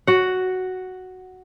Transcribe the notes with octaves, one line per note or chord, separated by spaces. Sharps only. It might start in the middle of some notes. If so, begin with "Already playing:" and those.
F#4 F#5